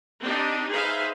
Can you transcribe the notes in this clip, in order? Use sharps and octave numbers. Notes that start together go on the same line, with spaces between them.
C4 D4 D#4 G4
D#4 G#4 B4 C5 E5 F5